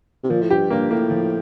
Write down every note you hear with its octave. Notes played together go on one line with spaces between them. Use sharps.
C3
A#2 F3
A2
G2 G4
G2 A#3
A2 A#3
F3